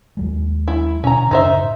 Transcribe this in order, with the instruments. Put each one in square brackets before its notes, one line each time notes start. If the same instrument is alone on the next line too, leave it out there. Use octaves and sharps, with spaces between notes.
[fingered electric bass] D#2 F#3 G#3
[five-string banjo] E4
[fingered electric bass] B2 D3 [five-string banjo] C#4 A#5
[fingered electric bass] F#2 A2 C#3 [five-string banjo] D#4 C5 E5